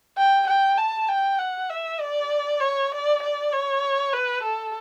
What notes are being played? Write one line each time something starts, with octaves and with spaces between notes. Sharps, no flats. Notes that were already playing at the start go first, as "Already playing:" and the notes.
G5
G5
A5
G5
F#5
E5
D5
C#5
D5
D5
C#5
B4
A4